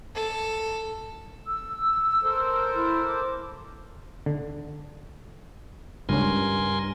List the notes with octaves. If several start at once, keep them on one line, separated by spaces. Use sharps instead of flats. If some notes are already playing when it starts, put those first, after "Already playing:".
A4
E6
A4 A#4 C5
E4
D6
D3
C#2 G2 C#4 A#4 G#5 C6